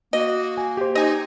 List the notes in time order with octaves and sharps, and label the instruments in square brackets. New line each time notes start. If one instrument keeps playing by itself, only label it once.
[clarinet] A#3 [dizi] F#4 [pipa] D#5
[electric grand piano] G#5
G4 C5
[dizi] D#4 [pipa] D#5 G#5